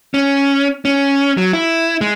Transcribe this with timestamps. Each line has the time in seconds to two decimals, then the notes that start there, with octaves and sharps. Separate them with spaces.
0.14 C#4
0.85 C#4
1.37 F#3
1.53 E4
2.01 G#3